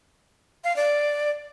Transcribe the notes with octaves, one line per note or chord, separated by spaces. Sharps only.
F5
D5